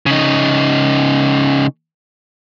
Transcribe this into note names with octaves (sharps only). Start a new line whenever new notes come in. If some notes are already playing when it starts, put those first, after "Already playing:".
C#3 D#4